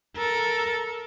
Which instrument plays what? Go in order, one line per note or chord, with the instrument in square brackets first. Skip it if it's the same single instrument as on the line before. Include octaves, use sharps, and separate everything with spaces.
[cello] A4 A#4